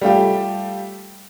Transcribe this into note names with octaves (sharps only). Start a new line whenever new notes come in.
G3 A3 F4 G4